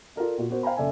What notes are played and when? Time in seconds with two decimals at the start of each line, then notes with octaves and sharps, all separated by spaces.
0.16 F4 A4 A#4 D5
0.38 A#2 F4 F#4
0.50 B3 F#4 A#4 C5
0.63 C5 F5 G5 G#5 A#5 B5
0.77 F#1 A4 D5 E5 G#5